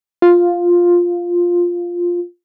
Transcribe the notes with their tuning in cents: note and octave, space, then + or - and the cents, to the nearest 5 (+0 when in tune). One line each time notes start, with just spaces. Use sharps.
F4 +5